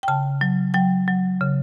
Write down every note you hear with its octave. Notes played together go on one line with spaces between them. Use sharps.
G5
C#3 A5
F#3
F#3 G5
F#3
C#3